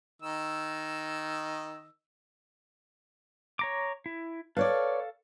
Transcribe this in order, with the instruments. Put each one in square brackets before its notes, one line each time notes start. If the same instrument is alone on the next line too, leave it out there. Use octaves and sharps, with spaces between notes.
[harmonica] D#3 D#5 E6
[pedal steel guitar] C#5 A#5 D6
E4
[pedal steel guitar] A4 F5 [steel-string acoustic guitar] B4 C#5 D5